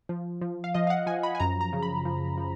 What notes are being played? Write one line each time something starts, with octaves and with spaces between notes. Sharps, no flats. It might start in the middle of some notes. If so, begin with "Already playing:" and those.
F3
F3
F5
F3 D#5
F5
F#5
F3 G#5
B5
G#5
F#2 A#5
A#5
C#3
B5
F3
F3